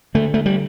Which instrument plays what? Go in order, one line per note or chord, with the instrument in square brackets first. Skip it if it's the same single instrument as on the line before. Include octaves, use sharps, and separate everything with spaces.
[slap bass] D3 A3
A3
G3